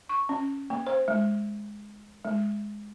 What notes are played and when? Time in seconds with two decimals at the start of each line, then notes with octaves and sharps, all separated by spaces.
0.09 C#6
0.29 C#4
0.70 A#3
0.87 C5
1.08 G#3
2.25 G#3